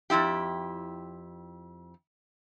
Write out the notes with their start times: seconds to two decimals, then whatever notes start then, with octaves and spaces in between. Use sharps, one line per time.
0.10 F2 A#2 E4 G4